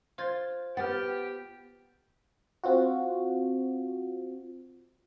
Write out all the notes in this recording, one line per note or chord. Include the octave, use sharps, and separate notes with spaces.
F4 C5 G#6 A6
B3 G4 F#5 F6 A6
C4 F4 F#4